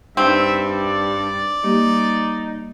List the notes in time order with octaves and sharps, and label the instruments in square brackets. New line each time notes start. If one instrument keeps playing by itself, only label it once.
[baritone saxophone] G2 [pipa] C4 [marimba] D#4 [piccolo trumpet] E5
[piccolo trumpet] D5
[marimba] G3 A#3 G4 [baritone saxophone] D#4